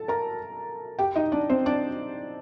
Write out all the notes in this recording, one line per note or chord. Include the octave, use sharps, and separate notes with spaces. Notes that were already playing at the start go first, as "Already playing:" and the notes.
Already playing: A4 A5
A#4 A#5
G4 G5
D#4 D#5
D4 D5
C4 C5
D4 D5